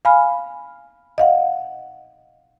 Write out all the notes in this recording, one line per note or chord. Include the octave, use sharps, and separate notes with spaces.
F5 G#5 B5 F6
D#5 F5 F#5